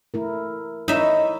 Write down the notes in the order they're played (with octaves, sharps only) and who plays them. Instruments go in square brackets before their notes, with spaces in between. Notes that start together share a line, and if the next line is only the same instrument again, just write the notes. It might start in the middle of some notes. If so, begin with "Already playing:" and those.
[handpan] A3 E4 A#4
[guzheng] D#4 E5 [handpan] E4 C#5